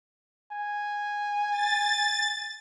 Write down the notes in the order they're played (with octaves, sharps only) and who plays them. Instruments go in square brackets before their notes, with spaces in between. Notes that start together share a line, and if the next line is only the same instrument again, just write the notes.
[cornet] G#5
[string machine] A6